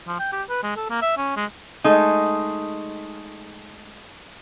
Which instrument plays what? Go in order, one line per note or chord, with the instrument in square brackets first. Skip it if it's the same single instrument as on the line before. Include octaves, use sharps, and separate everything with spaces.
[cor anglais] F3
G5
G4
B4
G#3
A4
A#3
E5
C#4
G#3
[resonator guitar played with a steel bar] G#3 A3 D#4